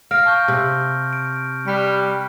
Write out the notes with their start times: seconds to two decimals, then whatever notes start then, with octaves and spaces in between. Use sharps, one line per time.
0.11 F5 F6 A#6 D7
0.26 A5 C#6 G6
0.48 C3
1.13 D7
1.66 G3 F#6 B6 C#7